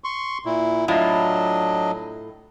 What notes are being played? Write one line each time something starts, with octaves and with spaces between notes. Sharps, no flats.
C6 C#6
A#2 E4
A2 F#3 D4 E4 F4 D#5